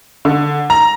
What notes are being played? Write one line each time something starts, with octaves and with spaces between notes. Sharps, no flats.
D3
A#5